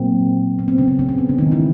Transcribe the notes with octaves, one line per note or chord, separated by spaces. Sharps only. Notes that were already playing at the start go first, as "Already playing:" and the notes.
Already playing: A#2 F#3 A#3 C4
B3
C4
C#3 C#4
C4
C#3 C#4
B3
C4
C#3 C#4
D#3 G#3 B3 D#4
E3 E4